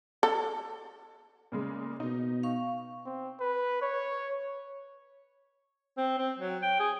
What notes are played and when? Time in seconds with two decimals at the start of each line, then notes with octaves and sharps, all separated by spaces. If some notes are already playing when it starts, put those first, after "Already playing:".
0.23 A4
1.52 A#2 C#3 G#3
2.00 B2 D#4
2.43 F5 C#6
3.06 C4
3.40 B4
3.82 C#5
5.98 C4
6.18 C4
6.39 F#3
6.62 G5
6.80 G#4